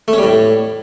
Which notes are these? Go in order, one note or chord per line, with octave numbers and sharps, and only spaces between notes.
A3
C#4
G3
A2